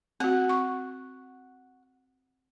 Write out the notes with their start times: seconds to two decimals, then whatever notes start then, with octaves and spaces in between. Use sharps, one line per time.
0.20 C4 F#4 F#5
0.49 C#6